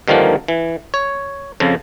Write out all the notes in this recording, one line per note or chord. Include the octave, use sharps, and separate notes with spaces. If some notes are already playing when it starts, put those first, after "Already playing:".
G2 D3 D#3 F3 A#3
E3
C#5
F2 C#3 F3